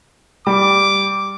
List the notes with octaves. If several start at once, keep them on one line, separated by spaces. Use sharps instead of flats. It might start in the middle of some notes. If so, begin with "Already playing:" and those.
G3 D6